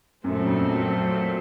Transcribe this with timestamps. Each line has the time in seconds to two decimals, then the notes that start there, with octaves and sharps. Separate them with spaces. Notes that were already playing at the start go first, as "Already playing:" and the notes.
0.24 F#2 A#2 F#3 A3 C4
0.46 F2